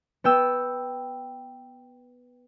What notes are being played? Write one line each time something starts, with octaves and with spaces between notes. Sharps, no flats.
B3 G5 E6